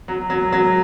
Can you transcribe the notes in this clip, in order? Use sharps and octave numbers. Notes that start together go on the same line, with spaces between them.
F#3
F#3
F#3